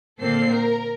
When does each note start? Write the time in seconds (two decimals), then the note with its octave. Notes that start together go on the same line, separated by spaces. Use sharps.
0.21 A#2 D3 A#3 C4 A4 C7
0.51 A#4